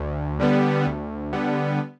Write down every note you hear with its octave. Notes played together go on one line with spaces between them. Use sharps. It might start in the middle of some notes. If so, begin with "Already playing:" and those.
Already playing: D2
D3 G3 B3
D2
D3 G3 B3